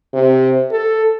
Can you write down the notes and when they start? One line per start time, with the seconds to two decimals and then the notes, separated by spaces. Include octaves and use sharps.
0.13 C3
0.71 A4